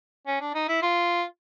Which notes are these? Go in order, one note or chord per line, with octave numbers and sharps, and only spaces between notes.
C#4
D4
D#4
E4
F4